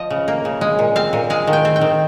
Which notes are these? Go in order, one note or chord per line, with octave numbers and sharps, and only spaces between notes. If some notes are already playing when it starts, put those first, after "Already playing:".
Already playing: F3 D#5
C#3
A#3
C#3
G#3
A#2
C4 F5
A#2
G#3 F5
D#3
G5
C4
G5
D#3